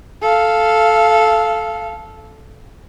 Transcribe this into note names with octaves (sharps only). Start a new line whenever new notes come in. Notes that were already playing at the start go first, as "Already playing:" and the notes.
A4 F5